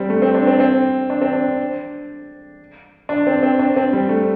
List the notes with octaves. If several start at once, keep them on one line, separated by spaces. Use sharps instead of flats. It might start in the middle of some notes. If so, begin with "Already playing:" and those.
Already playing: G3 C4
A3
C4
D4
C4
C4
D4
C4
D4
D4
C4
C4
D4
C4
G3
A3